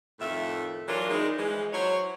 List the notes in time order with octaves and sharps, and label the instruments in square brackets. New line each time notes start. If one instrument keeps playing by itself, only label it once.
[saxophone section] F2 A2 D#3 A3 F4 E5
E3 F#3 D4 F4 A#4
E3 G#3 B3 D4 D#4
E3 F3 G#3
F#3 E4 C5 C#5